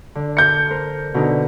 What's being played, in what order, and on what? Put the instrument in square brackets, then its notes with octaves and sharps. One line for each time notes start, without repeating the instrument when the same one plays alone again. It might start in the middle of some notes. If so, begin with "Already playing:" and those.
[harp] D3
[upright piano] G6 C#7
[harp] A#4 C5
B2 D3 D#4